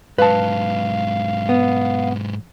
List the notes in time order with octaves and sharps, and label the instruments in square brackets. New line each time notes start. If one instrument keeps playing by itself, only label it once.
[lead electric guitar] G#2 F#3 [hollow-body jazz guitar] B4 A5 [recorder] F5
[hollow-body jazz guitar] B3